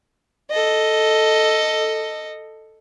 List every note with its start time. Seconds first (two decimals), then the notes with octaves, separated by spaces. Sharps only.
0.51 A4 D#5